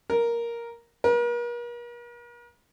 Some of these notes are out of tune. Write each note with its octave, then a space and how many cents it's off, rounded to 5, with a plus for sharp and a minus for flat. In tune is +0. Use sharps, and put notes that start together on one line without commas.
A#4 +5
A#4 +45